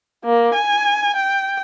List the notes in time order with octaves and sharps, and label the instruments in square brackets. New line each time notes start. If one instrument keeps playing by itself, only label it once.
[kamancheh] A#3
G#5
G5